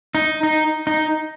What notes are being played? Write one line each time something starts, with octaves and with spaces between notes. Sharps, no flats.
D#4
D#4
D#4